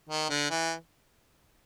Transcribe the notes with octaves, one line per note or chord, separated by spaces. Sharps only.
D#3
D3
E3